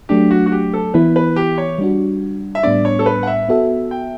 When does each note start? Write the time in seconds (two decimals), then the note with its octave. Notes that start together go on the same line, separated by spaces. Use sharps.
0.09 F#3 A3 D4 G4
0.31 F#4
0.46 F#4
0.52 G4
0.74 A4
0.94 E3 B3 E4 B4
1.16 B4
1.36 G4
1.58 C#5
1.79 G3 D4 F#4
2.55 E5
2.63 A2 G3 B3 D4 D5
2.85 C#5
2.99 A4
3.06 B4
3.23 F#5
3.27 E5
3.49 B3 F#4 A4 E5
3.91 G5